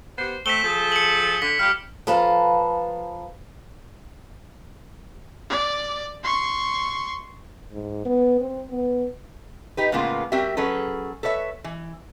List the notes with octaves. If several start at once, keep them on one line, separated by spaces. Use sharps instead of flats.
B3 G4 C5
A3 C4 B6 E7 G7
F3 G#4 A4
C#7 F#7
D3 B6
G3 F4 G4 F6
F3 A4 B4 F5 A5 A#5
D5
C6 C#6
G#2
B3
C4
B3
D#4 G4 B4
A2 C#3 G#3 A#3 B3 F4
G3 C4 F#4 G4 A#4 E5
F#3 C#4 G#4 A4 B4
A4 B4 C#5 E5
E3